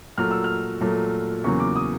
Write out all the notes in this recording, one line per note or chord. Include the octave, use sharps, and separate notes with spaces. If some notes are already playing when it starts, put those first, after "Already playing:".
A#2 F#3 A3 F6
E6
F6
A#2 F#3 A3
E2 C#3 F#3 A#3 C#6
D6
D#6